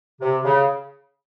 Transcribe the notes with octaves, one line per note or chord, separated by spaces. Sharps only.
C3
C#3